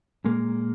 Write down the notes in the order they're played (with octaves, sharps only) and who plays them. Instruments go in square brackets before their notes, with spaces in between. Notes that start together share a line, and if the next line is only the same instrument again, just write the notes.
[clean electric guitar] A#2 G#3 A#3